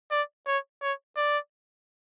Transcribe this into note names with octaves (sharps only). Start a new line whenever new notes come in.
D5
C#5
C#5
D5